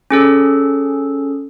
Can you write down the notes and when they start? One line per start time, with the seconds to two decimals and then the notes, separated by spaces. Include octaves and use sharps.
0.11 C#4 G#4 A4